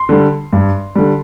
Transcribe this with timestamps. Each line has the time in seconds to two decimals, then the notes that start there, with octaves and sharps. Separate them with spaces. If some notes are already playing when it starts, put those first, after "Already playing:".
Already playing: C6
0.09 D3 G3
0.53 G2
0.95 D3 G3